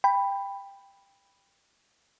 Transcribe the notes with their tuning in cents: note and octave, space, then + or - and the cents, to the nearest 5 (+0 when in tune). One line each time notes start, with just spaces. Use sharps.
G5 +15 B5 +0